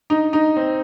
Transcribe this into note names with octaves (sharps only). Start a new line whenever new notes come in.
D#4
D#4
C4